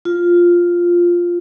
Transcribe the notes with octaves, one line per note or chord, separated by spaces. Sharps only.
F4